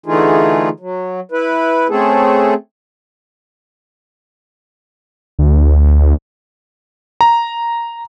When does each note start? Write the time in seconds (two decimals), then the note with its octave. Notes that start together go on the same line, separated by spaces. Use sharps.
0.06 D3 E3 A3 D#4 F4 G#4
0.80 F#3
1.32 E4 B4
1.89 A3 C4 C#4 G#4 A4
5.39 D2
7.21 A#5